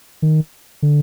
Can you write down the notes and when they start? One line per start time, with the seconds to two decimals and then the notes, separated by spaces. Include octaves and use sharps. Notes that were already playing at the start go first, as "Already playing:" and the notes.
0.22 D#3
0.82 D3